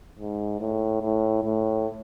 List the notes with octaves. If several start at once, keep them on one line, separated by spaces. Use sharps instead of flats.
G#2
A2
A2
A2